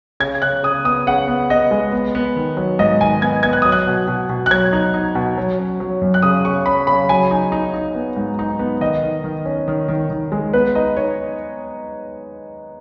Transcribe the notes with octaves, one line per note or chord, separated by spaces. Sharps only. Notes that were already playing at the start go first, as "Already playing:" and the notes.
C#3 G#6
C#3 F#6
C#3 D#6
B3 D#6
C#3 F#5
B3
B3 D#5
G#3
B3
B3
D#3
F#3
G#2 D#5
D#3 G#5
B3 G#6
B3 G#6
F#6
F#3 D#6
F#6
B2
B2
B2
F#6
F#3 G#6
D#4
D#4
B2
F#3
C#4
F#3
F#2
F#6
C#3 D#6
C#3 C#6
C#4 B5
C#3 B5
F#3 G#5
D#4
D#4
D#4
B3
G#2
D#4
B3
D#3 D#5
D#3
D#3
C#4
D#3
D#3
D#3
G#3
B3 B4
D#4 D#5
D#4 C#5